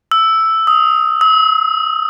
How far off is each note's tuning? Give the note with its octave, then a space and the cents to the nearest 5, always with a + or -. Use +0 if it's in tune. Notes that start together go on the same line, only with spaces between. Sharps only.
E6 +0
D#6 +15
E6 -40